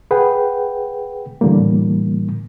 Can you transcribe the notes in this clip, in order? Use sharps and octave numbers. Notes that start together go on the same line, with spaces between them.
G#4 B4 F#5 G5
A2 D3 E3 G3 A#3